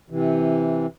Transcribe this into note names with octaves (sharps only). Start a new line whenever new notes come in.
C3 E3